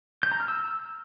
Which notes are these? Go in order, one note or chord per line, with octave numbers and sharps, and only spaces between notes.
G6
A#5
F6
E6